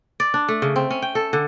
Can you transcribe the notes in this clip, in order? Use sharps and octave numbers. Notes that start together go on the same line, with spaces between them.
D5
D4
A3
C#3
C4
C#4
G5
A4
D3